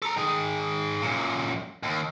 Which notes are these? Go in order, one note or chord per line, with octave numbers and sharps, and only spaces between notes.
A4 A#5
D#3 G#4
F#2 A#2
D#2